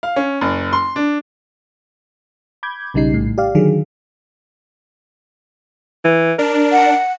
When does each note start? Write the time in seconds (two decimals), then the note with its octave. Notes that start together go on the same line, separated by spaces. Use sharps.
0.03 F5
0.16 C#4
0.41 F#1
0.73 C6
0.96 D4
2.63 B5 D6 G6 G#6
2.94 B1 C#3 G3 D#4 C7
3.14 A#1 A2
3.38 G4 D5 F5
3.55 D3 D#3 F#3 G#4
6.05 E3
6.39 D4 A#4
6.72 F#5